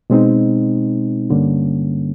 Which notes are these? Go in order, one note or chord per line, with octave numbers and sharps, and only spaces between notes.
B2 G#3 C4 D#4
G2 D3 G3 A#3 C#4